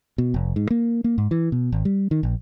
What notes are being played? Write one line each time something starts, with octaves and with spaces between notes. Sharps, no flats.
B2
F1
G#2
A#3
A#3
G#2
E3
B2
G#1
G3
D#3
A#1